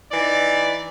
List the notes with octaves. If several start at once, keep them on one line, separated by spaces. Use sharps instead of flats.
E3 D#4 D5